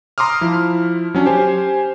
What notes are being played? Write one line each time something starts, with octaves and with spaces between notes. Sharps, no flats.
A#5 C6 D6 D#6 F6
F3 E4
F#3 C#4 D4
G4 C5 G#5